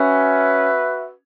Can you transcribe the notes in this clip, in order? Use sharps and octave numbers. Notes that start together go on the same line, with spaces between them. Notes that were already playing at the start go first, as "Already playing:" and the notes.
Already playing: C#4 F#4 B4 E5